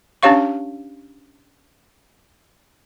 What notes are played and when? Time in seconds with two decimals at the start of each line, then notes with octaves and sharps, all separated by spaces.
0.23 C#4 D4 G4 C#5 F5 C#6